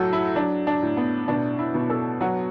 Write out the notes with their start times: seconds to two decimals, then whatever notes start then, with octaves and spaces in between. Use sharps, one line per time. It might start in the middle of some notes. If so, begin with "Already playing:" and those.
Already playing: A2 F#3 F#4 A4
0.13 E4
0.36 F#3 D4
0.67 D4
0.82 A2
0.97 B3
1.28 B2 D4
1.59 E4
1.74 B2
1.90 A4
2.21 F#3 F#4